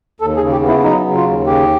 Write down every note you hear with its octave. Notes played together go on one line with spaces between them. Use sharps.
D#2 A4
G#4
C#3
G4
B3
E4
F#3 D#4
C#3
F4
D#2
C#3 G4